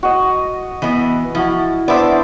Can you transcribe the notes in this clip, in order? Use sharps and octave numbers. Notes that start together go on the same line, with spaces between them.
F#4 D#5
E3 B3 D#5
F3 E4 F#4
B3 D4 C5 D5 E5